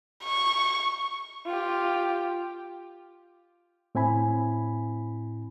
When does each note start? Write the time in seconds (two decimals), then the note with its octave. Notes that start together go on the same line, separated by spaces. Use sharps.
0.24 C#6
1.47 F4 G4
3.95 A2 C4 E4 G#5 B5